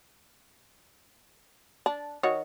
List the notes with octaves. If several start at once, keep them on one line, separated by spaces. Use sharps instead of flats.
D4
D#3 F#4 C#5